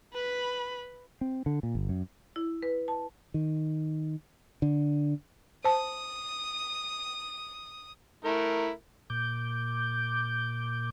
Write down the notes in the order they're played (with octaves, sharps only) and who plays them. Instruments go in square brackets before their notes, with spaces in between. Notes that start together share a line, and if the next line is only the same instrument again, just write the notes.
[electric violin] B4 B5
[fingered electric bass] C4
D3
A#2
G1
F#2
[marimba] E4
B4
A5
[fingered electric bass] D#3
D3
[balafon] C5 A5 [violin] D#6
[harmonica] A3 E4 A#4
[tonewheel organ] A#2 D6 G6